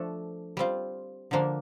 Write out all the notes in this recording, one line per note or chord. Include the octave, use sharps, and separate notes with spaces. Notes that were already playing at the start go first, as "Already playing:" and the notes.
Already playing: F3 A3 D4 A4
G3 C4 F4
D3 F3 A#3 D4